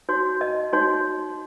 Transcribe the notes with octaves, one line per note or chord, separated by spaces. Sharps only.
D#4 F#4 C#5
D#5
D#4 F#4 C#5